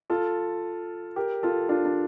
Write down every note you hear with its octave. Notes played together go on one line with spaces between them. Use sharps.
F4 A4
G4 A#4
F4 A4
D4 F4
D4